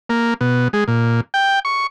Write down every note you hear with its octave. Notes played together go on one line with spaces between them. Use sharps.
A#3
B2
G#3
A#2
G5
C#6